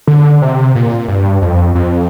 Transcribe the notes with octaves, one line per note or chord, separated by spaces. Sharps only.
D3
C3
A#2
G2
F2
F2